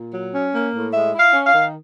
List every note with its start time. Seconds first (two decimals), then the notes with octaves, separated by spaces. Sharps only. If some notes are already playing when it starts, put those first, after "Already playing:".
Already playing: A#2
0.14 F#3
0.34 C#4
0.54 A#3
0.74 A2
0.93 G#3 E5
1.13 E4
1.19 F5
1.33 C#4
1.46 F5
1.53 D#3